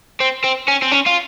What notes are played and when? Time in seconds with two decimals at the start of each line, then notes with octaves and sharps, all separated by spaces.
0.20 C4
0.44 C4
0.68 C#4
0.82 C4
0.92 C#4
1.07 F4